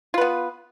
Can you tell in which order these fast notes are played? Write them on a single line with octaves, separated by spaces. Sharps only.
F4 B4 B3